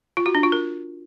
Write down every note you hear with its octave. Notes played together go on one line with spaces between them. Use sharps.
F4
F#4
D4
F4
A#4